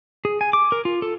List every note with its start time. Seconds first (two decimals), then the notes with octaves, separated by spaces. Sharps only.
0.25 G#4
0.41 G#5
0.53 D6
0.72 A#4
0.85 F4
1.02 A4